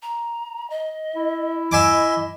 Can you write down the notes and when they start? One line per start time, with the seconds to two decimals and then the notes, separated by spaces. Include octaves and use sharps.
0.02 A#5
0.70 D#5
1.16 E4
1.72 D#5 E5 G#5 D6